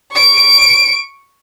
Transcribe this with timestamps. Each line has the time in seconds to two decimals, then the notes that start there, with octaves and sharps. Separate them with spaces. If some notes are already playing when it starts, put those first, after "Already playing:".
0.12 C#6 D7